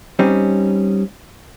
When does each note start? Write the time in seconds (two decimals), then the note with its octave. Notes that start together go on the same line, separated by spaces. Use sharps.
0.19 G3 C4 C#4 D#4